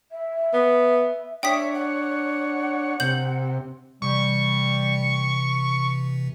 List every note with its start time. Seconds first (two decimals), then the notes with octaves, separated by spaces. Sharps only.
0.12 E5
0.53 B3
1.43 D4 C#5 E5 G5 D#6 B6
1.74 F#5
3.00 C3 G6 F#7
4.02 C3 E3 G3 C#6